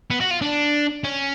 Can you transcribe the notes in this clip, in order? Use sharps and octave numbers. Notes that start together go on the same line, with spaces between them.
B3
F#4
F4
D4
C#4